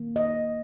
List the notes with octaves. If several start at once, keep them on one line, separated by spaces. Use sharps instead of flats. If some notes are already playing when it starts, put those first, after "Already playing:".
Already playing: D#3 A#3
D#5